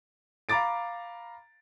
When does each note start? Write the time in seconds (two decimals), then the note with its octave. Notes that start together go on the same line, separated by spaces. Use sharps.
0.49 F5 A#5 B5 D6 A6 D7